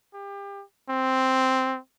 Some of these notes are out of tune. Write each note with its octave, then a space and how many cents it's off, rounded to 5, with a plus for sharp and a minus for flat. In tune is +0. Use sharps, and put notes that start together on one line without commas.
G4 +30
C4 +0